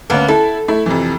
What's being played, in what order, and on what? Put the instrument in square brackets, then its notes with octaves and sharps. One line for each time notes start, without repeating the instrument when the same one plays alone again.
[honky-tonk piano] D2 C#4 [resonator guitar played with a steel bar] A#3 B3
[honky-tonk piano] E4 [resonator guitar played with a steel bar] A4
[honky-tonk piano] A3 E4
F2 C3 E3